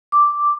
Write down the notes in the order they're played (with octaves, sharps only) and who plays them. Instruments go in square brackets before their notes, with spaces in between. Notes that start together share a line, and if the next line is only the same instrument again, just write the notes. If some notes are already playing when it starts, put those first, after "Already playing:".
[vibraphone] D6